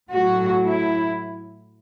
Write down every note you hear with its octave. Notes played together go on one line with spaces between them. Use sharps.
A2 F#3 F#4
E4